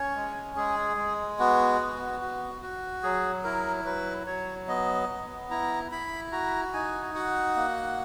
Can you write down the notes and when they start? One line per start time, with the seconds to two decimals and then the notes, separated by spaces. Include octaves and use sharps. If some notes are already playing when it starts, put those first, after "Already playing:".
Already playing: C#4 C#5
0.16 G#3
0.56 G#3 G#4
0.97 G#3
1.39 B3 F#4
1.80 B3
2.21 F#4
2.61 F#4
3.03 F#3 G#4
3.44 E4 A#4
3.85 F#3 B4
4.26 F#3 C#5
4.68 B3 D#5
5.09 B3
5.50 E4 A#5
5.92 E4 B5
6.32 F#4 A#5
6.73 D#4 G#5
7.15 F#4 F#5
7.55 A#3